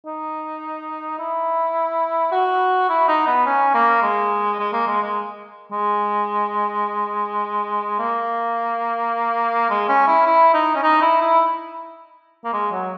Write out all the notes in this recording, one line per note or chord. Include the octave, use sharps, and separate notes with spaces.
D#4
E4
F#4
E4
D#4
B3
C#4
A#3
G#3
G#3
A#3
G#3
G#3
G#3
A#3
G#3
C#4
E4
E4
D#4
C#4
D#4
E4
E4
A#3
G#3
F#3